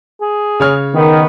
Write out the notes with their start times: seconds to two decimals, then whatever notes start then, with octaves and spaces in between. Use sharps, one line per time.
0.21 G#4
0.60 C#3 C#5 F6
0.95 D#3 B3